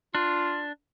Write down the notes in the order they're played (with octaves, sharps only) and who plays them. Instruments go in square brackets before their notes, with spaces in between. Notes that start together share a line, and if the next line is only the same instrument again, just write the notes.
[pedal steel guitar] D4 [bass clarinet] F4